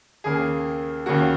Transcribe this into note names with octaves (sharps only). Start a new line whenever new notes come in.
D#2 C#3 A#3 G#4
D#2 C#3 A#3 F#4